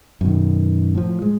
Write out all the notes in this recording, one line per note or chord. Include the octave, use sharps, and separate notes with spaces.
F#2 B2 D#3
A2 F3
G#3